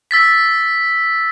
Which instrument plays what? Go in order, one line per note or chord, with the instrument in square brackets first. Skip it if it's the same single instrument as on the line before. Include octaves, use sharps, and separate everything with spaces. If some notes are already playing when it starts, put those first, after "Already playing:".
[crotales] E6 A6 B6